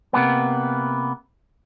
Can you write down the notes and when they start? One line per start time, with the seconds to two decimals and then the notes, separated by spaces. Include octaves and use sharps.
0.13 C3 A#3 B3